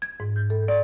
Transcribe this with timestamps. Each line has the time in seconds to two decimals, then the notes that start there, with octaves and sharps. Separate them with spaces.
0.02 G#6
0.20 G#2
0.36 G6
0.50 A4
0.68 D5